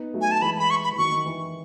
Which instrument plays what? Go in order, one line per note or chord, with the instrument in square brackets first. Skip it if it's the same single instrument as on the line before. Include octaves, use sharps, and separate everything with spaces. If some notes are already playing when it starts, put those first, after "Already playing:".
Already playing: [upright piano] B3 D#4
F#3 A3
[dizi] G#5
A5
[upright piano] E3 G#3 [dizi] B5
[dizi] B5
C#6
B5
[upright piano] E3
[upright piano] D#3 F#3 [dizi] C#6
[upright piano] D#3
E3